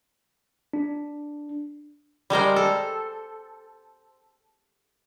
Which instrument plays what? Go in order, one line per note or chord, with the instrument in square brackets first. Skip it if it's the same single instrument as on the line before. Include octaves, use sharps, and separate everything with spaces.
[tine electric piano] D4
[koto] G3 G#3 A#4 C5
A4